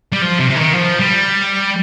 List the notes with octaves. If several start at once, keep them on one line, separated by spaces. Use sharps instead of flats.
G3
F3
C3
C3
D#3
F3
G3